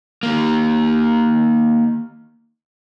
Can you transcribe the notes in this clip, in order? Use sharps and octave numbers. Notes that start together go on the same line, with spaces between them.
D#3 A#3